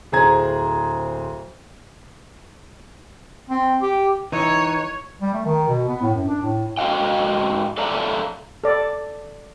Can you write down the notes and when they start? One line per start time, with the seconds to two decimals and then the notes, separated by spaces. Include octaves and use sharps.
0.12 D1 G#4 C5 A#5 G#6
3.50 C4
3.82 G4
4.32 E3 D#4 C#5
5.21 G3
5.34 A3
5.45 D#3
5.68 B2
5.89 B3
6.01 A2
6.15 F#2
6.28 D4
6.42 A2
6.77 G#2 F#4 D#5 F5 G5
7.78 A4 D5 E5 F5 A5 A#5
8.64 A4 D5